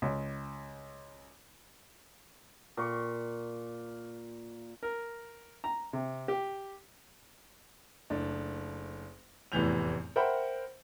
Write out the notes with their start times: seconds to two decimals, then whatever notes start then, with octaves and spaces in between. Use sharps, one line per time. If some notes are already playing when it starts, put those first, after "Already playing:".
0.02 C#2
2.77 A#2 C#6
4.83 A#4
5.64 A#5
5.93 C3
6.28 G4
8.10 F#1 A3 D4
9.52 F1 E2 A2 E3 G6 F7
10.16 A#4 C5 E5 F#5 G5 B5